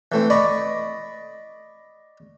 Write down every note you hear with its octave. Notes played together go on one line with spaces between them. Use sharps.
E3 A3 C4
D5 D#5 B5 C#6